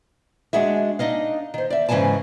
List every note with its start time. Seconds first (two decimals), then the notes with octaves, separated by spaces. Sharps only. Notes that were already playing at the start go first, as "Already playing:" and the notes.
0.53 G#3 D4 F#4 G#4 E5
0.99 D4 D#4 D#5 F5
1.54 D#3 C5
1.70 D5 E5
1.89 G#2 C#3 E3 G#3 G#5 A5